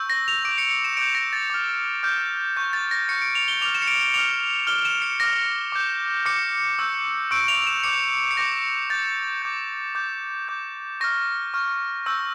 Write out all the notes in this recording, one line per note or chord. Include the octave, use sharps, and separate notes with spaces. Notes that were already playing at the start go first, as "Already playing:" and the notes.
Already playing: C#6 E6 G6
A#6
F7
D6 G6 D7
C#7
C#7
E7
D6 G6 D7
A#6
A6
D6 F6
D6 F6 G6
C#6 G6
A6
A#6
C#6 G6 C#7
D7
F7
G7
D6 F6 F7
E7
C#7
D7
D7
D6 F6 F7
D6 F6 G7
E7
C#7
D6 F6 A#6
D6 G6
D6 G6 C#7
C#6 E6 G6
C#6 E6 G6 D7
F7
F7
E7
D6 G6 C#7
C#7
D6 G6 A#6
D6 G6 A6
D6 G6
D6 G6
D6 G6
C#6 F6 A#6
C#6 F6
C#6 E6 G6